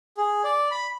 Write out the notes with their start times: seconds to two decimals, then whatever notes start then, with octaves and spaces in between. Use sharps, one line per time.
0.17 G#4
0.44 D5
0.71 B5